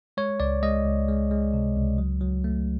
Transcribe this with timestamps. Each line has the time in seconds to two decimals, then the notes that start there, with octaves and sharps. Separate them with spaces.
0.17 G#3 C#5
0.40 C#2 D5
0.63 G#3 D#5
0.85 C#2
1.08 G#3
1.31 G#3
1.54 C3
1.76 C#2
1.98 F#3
2.21 F#3
2.44 A3